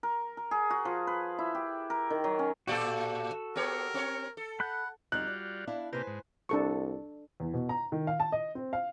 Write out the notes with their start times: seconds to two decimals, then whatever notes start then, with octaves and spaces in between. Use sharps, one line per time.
0.03 A#4
0.37 A#4
0.51 G#4
0.70 F#4
0.85 F3
1.07 B4
1.39 E4
1.55 G4
1.90 A#4
2.10 D#3
2.24 F#3
2.39 C#4
2.67 A2 F#4 G4 A4 D5
3.56 B3 G4 A#4 C#5
3.94 C4 C#5
4.37 A4
4.60 F#5 B5 F#6 G6
5.12 F2 D3 G3 D#4 F4 F#4 F#6
5.27 D5
5.67 D4 E4 F5
5.93 C3 A#3 G4 B4 C5 G#5
6.07 G#2
6.49 C2 D4 A4 C#6
7.40 E2
7.54 B2
7.69 A#5
7.92 D#3
8.07 F5
8.20 A5
8.32 D#5
8.55 C4
8.73 F5